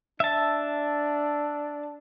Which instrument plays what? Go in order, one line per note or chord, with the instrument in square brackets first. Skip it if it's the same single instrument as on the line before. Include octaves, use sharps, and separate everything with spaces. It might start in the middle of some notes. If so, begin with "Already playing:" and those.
[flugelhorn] D4 [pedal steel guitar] E5 A5